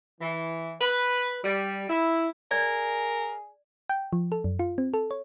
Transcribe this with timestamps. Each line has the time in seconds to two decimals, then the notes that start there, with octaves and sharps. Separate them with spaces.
0.21 E3
0.81 B4
1.43 G3
1.89 E4
2.51 G#4 A#4 D5
3.89 G5
4.13 F3
4.32 A4
4.44 F#2
4.59 F4
4.78 C4
4.94 A4
5.11 C#5